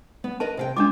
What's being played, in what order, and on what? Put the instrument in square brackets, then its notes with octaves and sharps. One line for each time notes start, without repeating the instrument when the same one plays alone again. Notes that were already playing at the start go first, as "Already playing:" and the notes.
[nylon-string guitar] B3
[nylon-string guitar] A#4 B4 D#5 [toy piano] A5
[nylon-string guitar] C3 F5 G5
[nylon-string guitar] G#3 F4 [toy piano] D4 D6